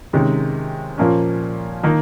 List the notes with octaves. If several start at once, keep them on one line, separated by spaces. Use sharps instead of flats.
C3 D#3 G#3 C#4
A#2 F3 A#3 C#4
D#3 A#3